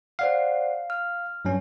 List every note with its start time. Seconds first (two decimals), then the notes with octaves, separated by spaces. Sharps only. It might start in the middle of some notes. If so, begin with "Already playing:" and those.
0.19 C5 D5 F5 F#5
0.90 F6
1.45 G2 F#3 C#4